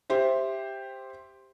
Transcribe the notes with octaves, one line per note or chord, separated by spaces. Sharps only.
G4 C5 E5